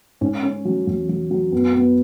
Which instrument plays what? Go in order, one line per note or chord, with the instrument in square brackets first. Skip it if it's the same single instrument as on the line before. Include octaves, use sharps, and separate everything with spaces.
[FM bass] G#2 [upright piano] C#4
[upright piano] C#4
F#3
[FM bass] E2 [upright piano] F#3
[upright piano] F#3
F#3
[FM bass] F#2 [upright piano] B3
[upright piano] B3